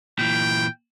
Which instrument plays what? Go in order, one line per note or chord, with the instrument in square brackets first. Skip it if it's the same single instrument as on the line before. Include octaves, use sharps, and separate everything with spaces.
[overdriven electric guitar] A#2 E3 [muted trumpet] G5